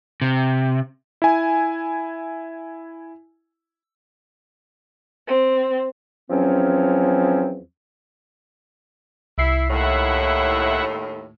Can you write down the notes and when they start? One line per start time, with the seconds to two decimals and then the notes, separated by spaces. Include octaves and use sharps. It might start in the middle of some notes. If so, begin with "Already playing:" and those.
0.21 C3
1.22 E4 G#5
5.26 C4
6.30 E2 F3 F#3 C4 C#4
9.38 C2 E4 C7
9.70 D#2 A2 E4 E5 F#5